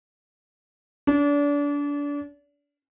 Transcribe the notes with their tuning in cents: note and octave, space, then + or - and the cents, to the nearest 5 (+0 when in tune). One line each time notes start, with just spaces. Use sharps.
D4 -30 D5 -35